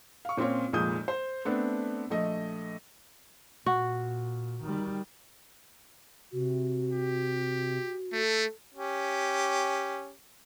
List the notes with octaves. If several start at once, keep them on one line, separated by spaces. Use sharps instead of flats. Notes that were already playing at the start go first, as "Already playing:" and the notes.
F5 C#6
A#2 C4 C#4 F4 C#5
F1 F2 A#2 G#3 D#6 G6
C5
A3 B3 C4 D4
A#1 A3 D#5
A#2 F#4
D#3 G3
C3 F#4
G4
A3 A4
C#4 G4